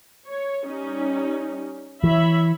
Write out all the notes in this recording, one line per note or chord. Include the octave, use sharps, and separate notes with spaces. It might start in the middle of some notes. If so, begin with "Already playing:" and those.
C#5
G3 C#4 D#4
E3 C#5 E5 B5